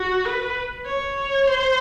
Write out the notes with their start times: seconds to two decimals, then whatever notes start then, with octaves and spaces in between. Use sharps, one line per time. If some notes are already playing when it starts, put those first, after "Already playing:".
Already playing: F#4
0.25 B4
0.86 C#5
1.47 C5